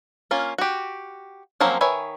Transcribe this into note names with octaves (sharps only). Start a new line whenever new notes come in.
A#3 C#4 F4
F#4 G4
F3 F#3 A#3 C4 C#4
D#3 B4 C#5 E5 G#5